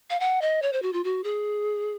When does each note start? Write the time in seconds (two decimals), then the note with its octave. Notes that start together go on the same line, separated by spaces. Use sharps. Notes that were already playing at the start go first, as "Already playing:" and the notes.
0.10 F5
0.20 F#5
0.42 D#5
0.62 C#5
0.73 C5
0.82 F#4
0.93 F4
1.04 F#4
1.24 G#4